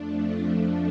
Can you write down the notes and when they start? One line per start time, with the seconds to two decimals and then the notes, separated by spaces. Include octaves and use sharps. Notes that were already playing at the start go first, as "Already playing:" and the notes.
Already playing: F2 F3 A3 D4